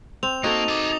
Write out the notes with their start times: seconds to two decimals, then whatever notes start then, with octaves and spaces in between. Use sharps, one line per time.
0.23 C4 F7
0.44 A#3 D#4 F#4 A4
0.69 G#4 A5 D6 D#6